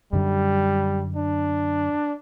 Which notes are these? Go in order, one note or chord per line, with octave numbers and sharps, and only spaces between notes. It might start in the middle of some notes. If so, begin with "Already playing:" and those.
F#2 D3 G3
D4